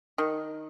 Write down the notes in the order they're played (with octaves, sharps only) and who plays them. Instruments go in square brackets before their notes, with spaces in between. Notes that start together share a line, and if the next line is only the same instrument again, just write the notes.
[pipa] D#3